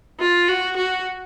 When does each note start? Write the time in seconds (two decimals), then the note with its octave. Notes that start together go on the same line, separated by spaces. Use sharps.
0.20 F4
0.49 F#4
0.77 F#4